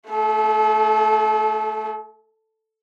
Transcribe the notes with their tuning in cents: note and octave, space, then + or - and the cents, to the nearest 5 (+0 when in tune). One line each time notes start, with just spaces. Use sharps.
A3 +0 A4 -40